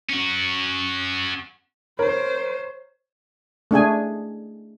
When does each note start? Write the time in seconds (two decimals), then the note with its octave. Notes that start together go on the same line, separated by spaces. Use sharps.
0.09 C#4 F#4
1.99 A#4 C5 C#5
3.71 A3 D4 G#4 G#5